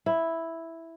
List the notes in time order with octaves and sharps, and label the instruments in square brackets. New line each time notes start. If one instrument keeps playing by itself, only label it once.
[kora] E4